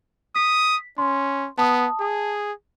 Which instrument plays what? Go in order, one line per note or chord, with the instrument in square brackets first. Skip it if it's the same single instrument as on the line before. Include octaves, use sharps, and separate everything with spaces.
[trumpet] D#6 [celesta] B6
[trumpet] C#4 [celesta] C6
[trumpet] B3 [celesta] A5 D#6
[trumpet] G#4